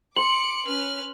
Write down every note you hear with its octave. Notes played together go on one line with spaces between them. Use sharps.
C6 D6 C#7 F#7
C#4 B4 F6